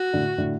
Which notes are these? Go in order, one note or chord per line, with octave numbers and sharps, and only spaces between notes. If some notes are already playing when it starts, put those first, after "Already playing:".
Already playing: F#4
A2 D3
A2 D3